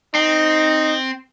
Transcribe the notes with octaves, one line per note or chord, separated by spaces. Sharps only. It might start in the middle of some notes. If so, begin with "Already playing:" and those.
C4 D#4